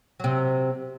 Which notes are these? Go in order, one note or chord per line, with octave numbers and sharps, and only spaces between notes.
C3 F#3